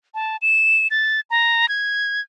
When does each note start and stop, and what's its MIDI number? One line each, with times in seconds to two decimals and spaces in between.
0.15 0.37 81
0.42 0.87 100
0.91 1.20 93
1.30 1.69 82
1.69 2.21 92